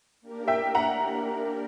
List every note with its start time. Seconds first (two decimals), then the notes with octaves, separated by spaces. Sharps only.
0.21 A#3 D4 G4 A#4
0.48 E5 G5
0.75 F#5 A#5